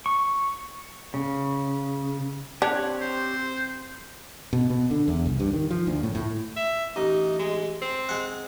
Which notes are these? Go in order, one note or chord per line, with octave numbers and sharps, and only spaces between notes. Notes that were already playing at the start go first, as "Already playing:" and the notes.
C#6
C#3
C4 D4 G4 C#5 F#6
C5
B2
B2
D3
E2
C2
G2
D#3
F3
D2
A2
A2
E5
A1 D#4
G#3
C4
G#3 F#5